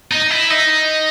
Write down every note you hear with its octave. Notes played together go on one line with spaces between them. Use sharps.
D#4
E4
D#4